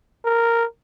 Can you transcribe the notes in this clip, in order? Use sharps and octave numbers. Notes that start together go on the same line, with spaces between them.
A#4